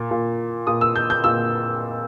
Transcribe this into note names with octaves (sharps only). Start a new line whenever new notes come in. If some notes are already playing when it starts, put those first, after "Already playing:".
Already playing: A#2
A#2
A#2 D#6
E6
G6
G6
A#2 E6